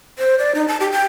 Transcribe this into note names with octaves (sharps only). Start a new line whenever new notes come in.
C5
D5
D#4
A5
G4
G5